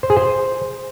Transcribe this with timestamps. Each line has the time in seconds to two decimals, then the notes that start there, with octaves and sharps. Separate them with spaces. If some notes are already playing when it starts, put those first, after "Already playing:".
0.03 C5
0.10 G#4
0.17 C5